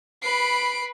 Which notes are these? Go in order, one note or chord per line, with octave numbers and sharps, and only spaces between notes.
B4 B5 C7 D7